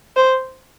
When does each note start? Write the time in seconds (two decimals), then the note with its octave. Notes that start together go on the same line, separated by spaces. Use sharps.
0.16 C5